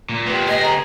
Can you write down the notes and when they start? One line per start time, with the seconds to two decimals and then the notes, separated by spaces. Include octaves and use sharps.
0.09 A#2
0.26 B3 G4
0.48 G#4 D#5
0.63 A#5